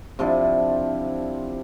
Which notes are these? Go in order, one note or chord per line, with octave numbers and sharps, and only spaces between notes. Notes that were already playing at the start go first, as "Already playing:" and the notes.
C3 F3 D4 E4